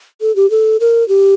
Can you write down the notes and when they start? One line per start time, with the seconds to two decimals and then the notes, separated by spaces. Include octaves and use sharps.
0.21 A4
0.36 G4
0.50 A4
0.80 A#4
1.08 G4